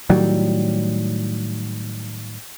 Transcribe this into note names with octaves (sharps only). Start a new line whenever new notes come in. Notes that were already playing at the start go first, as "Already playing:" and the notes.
A2 D#3 F#3 G3